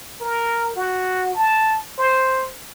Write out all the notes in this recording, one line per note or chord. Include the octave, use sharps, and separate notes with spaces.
A#4
F#4
A5
C5